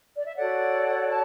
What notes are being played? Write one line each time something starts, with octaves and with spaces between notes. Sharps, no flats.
D5
E5
F#4 A4 C#5 D5 F#5
A5